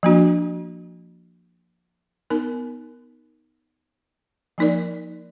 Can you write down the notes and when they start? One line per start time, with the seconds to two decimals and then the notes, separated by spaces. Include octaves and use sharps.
0.03 F3 A#3 D4 F#4
2.30 B3 D#4 A#4
4.58 F3 A#3 D#4 A#4 D5